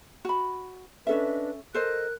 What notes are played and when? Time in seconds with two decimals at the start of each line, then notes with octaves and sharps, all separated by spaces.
0.25 F#4 B5
1.07 C#4 D4 A4 B4 D#5 E5
1.74 A4 A#4 C5 D#5 F#6